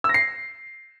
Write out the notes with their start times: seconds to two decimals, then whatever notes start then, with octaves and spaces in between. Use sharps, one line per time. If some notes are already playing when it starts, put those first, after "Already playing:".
0.04 E6
0.09 A#6
0.14 C7